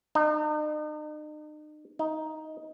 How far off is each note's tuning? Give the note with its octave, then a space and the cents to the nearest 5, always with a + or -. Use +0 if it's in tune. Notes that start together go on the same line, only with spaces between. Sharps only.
D#4 -40
D#4 +10